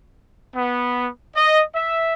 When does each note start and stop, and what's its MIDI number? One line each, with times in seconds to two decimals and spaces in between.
0.55 1.08 59
1.35 1.62 75
1.74 2.14 76